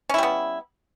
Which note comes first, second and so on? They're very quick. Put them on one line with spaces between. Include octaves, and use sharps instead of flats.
C#4 E4 G3 B3